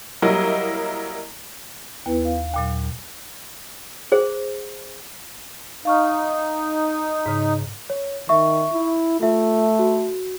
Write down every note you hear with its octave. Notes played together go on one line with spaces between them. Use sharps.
F#3 G3 A#3 E4 A#4 D#5
D#2 B3 E4 B4
F5
D#2 A#2 F#3
G#4 C5
D#4 F5 C#6 F6
G#2 C#3
C#5
D#3 E5 C#6
E4
A3 F4 E5
F#4